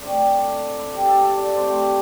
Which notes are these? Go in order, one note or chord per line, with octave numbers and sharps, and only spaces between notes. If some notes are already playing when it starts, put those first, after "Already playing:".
A2 A3 C4 D4
E4
G4
A4
A4
D5
C3 A3 C4 C5